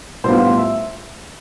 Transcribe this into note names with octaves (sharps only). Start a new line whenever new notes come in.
A2 G3 B3 D4 F4 C5
E5